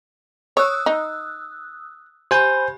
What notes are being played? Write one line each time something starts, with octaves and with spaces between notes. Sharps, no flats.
C#5 D#6 E6 F#6
D#4
G4 C5 G#5 B5 G6